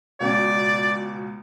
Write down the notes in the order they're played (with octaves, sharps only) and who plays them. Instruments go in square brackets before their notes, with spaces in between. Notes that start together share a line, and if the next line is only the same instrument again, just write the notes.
[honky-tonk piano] C#2 B2 C#4 [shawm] D5